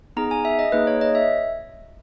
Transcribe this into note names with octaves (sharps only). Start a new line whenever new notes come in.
B3 D#4 G#4 A#5
G#5
E5
D#5
A#3 D#4 G#4 B4
C#5
D#5
E5